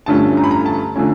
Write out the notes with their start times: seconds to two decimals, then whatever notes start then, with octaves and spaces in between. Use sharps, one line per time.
0.06 G2 D3 F3 A3 C#4 A5
0.37 A#5
0.44 B5
0.51 A#5
0.66 A5
0.96 D3 F3 A3 C#4 G#5